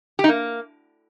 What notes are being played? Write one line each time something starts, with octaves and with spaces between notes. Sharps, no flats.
G4
D#4
A#3